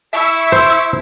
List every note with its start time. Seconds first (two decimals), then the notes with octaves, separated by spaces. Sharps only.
0.13 E4 E5 C#6 E6
0.52 C5